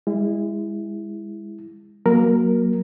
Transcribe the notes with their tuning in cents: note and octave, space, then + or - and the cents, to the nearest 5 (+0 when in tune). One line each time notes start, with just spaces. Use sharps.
G#3 -30 E4 +0
F#3 +0 A#3 +15 A#4 +0